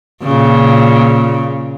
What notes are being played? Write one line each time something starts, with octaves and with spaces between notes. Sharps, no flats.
A#2 C#3